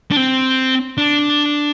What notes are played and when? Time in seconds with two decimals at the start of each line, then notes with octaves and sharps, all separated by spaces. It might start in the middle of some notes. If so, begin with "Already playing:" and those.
0.11 D4
0.17 C4
0.98 D4